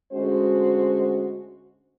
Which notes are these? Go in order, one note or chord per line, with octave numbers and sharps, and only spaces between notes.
D2 G#3 C#4 F#4 C5